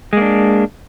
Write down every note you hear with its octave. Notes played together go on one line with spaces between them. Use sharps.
G#3 A#3 D4